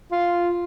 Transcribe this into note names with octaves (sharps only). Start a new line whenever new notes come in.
F4